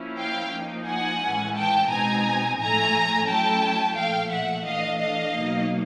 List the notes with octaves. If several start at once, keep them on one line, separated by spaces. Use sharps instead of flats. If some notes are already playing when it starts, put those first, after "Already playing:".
Already playing: F3 A#3 C#4 E4
F5 G5
F3 A#3 D#4
F#5 G#5
A2 E3 G#3 C#4
G5 A5
B2 G#3 C4 D#4 G#5 A#5
A2 F3 A3 G#5 A#5
F#3 A3 C#4 E4 G5 A5
A#2 F3 A3 F5 G5
E5 F#5
E3 A3 D4 D#5 F5
D#5 F5
B2 F#3 A#3 D#4